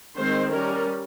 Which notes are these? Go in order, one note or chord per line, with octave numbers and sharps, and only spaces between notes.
D#3 G#3 C4 C5
G3 C#4 A#4